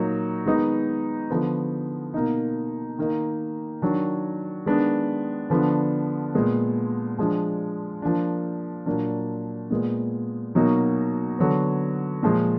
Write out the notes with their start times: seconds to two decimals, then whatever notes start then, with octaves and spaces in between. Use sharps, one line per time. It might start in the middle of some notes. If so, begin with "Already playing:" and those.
Already playing: A#2 F#3 A#3 D#4
0.46 D#3 G#3 B3 D#4
1.30 D3 F3 B3
2.14 B2 A#3 D#4
2.99 D#3 A#3 D#4
3.82 D#3 F#3 D4
4.66 D#3 G#3 B3 D4
5.50 D3 F3 B3 D4
6.35 A#2 G#3 B3
7.18 F3 G#3 D4
8.02 F3 A#3 D4
8.86 A#2 F#3 A#3 D4
9.70 A#2 G#3 B3
10.55 B2 F#3 A#3 D#4
11.39 D3 F#3 B3
12.23 A#2 F3 G#3